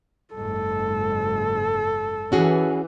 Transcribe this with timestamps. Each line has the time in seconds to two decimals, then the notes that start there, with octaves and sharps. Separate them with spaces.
0.34 F#1 G#2 A4
2.32 E3 C#4 F#4 G#4